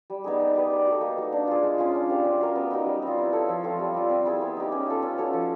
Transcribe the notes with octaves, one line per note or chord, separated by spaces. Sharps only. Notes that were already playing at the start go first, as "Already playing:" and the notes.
G3
B3 D#4 G#4
D#4
G4 B4 D5
D#4
F#4
A4
A#3
D#4 F#4
D4
F4 G#4
G#3
C#4 F4
D4
G4 C5 F5
C#4
F#4 A#4
B3
D#4 F#4 A#4
G3
C4 F4
E4
A4 C#5
F3
A3 C4 F4
G3
C4 F4
C4
E4 G#4 C5
B3
D#4 G4
C#4
F4 A4
C#4
F#4 A4 C#5
F3